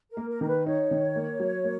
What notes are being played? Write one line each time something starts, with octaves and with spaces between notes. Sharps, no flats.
A#4
A#3
A#4
D#3 A#4
B4
D#4 C#5
D#3
A#3
F#3
A#3